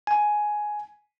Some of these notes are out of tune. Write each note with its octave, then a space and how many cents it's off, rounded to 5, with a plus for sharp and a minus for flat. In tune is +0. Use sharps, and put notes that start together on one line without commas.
G#5 +10